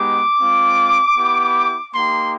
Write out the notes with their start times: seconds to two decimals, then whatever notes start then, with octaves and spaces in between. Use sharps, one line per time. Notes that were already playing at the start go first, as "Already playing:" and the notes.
Already playing: G#3 B3 D#4 G4 D6
0.41 G#3 C4 F4
1.17 B3 E4 G4
1.95 A#3 D#4 G4 C6